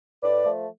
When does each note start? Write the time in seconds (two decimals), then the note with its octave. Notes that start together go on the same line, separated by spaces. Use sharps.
0.22 A2 B4 D5
0.44 F3 A3